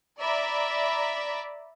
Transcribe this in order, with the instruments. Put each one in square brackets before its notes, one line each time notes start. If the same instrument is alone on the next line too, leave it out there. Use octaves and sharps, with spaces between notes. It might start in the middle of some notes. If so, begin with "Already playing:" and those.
[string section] D5 E5 A#5 B5